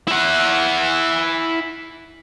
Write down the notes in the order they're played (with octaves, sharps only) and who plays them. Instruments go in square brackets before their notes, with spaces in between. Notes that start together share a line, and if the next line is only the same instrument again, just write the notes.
[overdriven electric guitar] E4 F#5